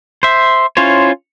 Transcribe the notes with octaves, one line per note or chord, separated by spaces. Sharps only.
C5 E5
C#4 E4 F4 C5 C#5